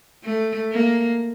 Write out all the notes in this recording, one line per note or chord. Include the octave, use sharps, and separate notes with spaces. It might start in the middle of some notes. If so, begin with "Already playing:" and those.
A3
A#3